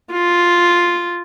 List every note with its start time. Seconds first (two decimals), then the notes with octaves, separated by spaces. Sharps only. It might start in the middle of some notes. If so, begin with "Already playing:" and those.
0.12 F4